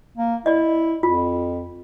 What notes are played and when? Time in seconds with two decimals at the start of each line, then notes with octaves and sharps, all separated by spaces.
0.17 A#3
0.46 E4 D5 D#5
1.03 F2 F4